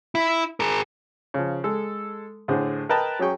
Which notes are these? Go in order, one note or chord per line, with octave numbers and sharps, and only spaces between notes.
E4
G#4 A#4
C#3 F3
G#3 A4
A2 D3 G#4 C5
A#4 B4 D#5 G5 A5
F#3 C#4 G#4 G5 C#6